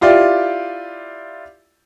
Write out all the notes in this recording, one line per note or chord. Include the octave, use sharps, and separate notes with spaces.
E4 F4 G4 D5